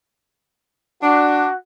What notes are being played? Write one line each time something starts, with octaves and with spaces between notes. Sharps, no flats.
D4 F#4